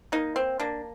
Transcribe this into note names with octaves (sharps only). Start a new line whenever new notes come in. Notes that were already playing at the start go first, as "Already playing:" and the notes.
A#3 D#4
C4
A#3 D4